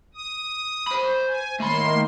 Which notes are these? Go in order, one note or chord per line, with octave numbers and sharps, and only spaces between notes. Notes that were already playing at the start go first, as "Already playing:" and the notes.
D#6
C5 B5
G#5
D#3 A3 A#3 B5 C6